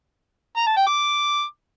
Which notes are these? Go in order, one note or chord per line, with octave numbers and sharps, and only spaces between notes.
A#5
A5
G5
D6